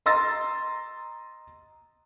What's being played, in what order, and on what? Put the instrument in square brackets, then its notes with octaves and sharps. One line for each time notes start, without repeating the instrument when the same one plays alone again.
[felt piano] D#5 A#5 C6 E6 A6 A#6